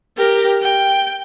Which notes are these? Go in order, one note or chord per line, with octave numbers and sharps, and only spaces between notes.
G4 A#4
G5